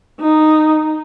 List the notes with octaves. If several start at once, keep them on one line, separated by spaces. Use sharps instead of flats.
D#4